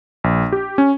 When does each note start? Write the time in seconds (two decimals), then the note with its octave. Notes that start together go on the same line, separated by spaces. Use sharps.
0.24 A#1
0.52 G4
0.78 C#4